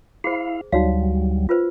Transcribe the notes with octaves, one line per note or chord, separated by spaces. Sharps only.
E4 G#4 C5 F5
D2 F#3 G3 D#4 F#4 F5
F4 B4 C5